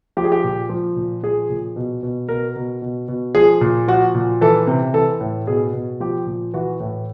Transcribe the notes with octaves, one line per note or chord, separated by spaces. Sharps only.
F3 G4
G#4
G4
A#2
F3
A#2
F3 G#4
A#2
B2
B2
B2 A#4
B2
B2
B2
F3 G#4
A#2
F3 F#4
A#2
E3 A4
C3
E3 A4
A2
B2 G#4
B2
F3 G4
A#2
E3 F#4
A2